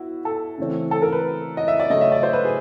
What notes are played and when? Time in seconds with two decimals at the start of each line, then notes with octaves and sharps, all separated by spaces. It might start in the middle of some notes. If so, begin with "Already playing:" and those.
Already playing: B3 E4 F#4
0.25 A4
0.58 C#3 E3 A3 C4
0.91 A4
1.02 A#4
1.12 B4
1.57 D#5
1.68 E5
1.80 D5
1.90 C#3 F#3 A3 D#5
2.01 E5
2.12 D5
2.23 C5
2.33 B4
2.45 G#4